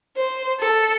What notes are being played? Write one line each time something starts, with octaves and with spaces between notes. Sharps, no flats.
C5
A4